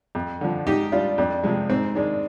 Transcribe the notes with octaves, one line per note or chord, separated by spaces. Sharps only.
F2
D3 F3
G#2 D#4 G4
G3 D4 F4
F2 D4
C3 F3 G#3
G#2 C4
D#3 G#3 D4